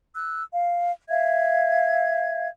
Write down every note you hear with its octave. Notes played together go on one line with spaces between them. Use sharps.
E6 F#6
F5
E5 F5 G#6